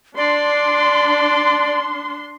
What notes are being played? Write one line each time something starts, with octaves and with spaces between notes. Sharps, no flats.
D4 D5 C6